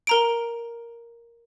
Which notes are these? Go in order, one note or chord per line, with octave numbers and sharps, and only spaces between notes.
A#4 A#5 D7